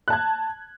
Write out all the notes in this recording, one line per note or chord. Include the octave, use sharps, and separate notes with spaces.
A5 F#6 G#6